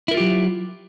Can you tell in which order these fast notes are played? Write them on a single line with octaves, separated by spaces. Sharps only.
E4 A#4 F4 G4 F#3